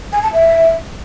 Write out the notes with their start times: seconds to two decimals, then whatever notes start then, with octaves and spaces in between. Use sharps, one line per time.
0.13 G#5
0.23 A5
0.33 E5